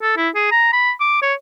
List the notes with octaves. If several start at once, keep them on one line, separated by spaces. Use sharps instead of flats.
A4
E4
G#4
A#5
B5
D6
C#5